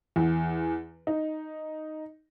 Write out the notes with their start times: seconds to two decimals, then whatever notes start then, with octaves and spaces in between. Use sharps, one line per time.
0.16 E2
1.07 D#4